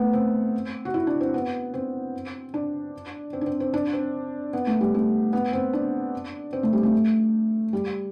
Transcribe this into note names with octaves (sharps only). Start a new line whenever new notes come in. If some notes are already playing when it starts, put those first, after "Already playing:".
Already playing: A3 B3
C4
F#4
E4
D4
C4
B3
C4
D4
C4
D4
C4
C4
D4
C4
B3
A3
G3
A3
B3
C4
D4
C4
A3
G3
A3
G3